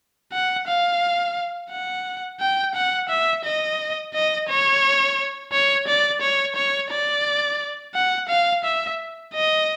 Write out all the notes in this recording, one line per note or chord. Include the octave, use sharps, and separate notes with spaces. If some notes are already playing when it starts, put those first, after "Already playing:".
F#5
F5
F#5
G5
F#5
E5
D#5
D#5
C#5
C#5
D5
C#5
C#5
D5
F#5
F5
E5
D#5